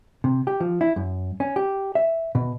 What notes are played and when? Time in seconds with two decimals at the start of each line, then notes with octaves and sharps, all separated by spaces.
0.24 C3
0.47 G4
0.60 F3
0.81 E4
0.96 F#2
1.40 C#4
1.56 G4
1.95 E5
2.35 B2